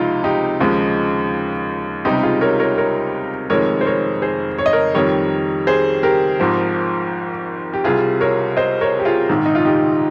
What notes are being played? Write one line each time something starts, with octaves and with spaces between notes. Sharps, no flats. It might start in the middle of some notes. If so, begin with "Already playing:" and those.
Already playing: C#2 C3 F3 G#3 D#4 F4
D#4 G4
D#2 C#3 F3 G#3
C#2 C3 G3 D#4 G4
F4 G#4
A#4 C#5
A#4 C#5
A#4 C#5
F1 F2 D#3 G#3 A#4 C#5
C5
A#4 C#5
G#4 C5
C#5
D#5
A#4 C#5
F2 D#3 G3 A#4 C#5
G#4 C5
G4 A#4
G#1 G#2 F3
G4
C2 C3 G3 F4 G#4
A#4 C#5
C5 D#5
A#4 C#5
G4
F4 G#4
A#1 G#2 D#3
D#4
F4
D#4 G4